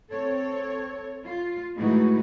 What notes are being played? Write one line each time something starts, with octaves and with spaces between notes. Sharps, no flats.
C4 A4 C#5
F4
A2 E3 G#3 A3 D#4 F#4